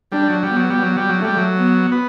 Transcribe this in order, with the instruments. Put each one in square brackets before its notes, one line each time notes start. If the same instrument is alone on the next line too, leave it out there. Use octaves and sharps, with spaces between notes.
[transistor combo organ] G3 [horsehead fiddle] D4
[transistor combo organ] F#3
[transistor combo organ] G3 [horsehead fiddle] B3
[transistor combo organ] F#3
G3
F#3
G3
F#3
[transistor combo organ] G3 [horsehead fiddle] A3
[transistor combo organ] F#3
[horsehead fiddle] B3
[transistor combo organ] B3